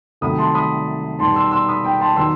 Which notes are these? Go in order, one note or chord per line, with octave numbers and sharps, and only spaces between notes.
C2 C3 D#3 F#3 A3 B5 D#6
A5 C6
B5 D#6
B2 G3 D#4 A5 C6
C6 E6
C6 E6
B5 D#6
G5 B5
A5 C6
D#3 F#3 B3 D#4 C6 E6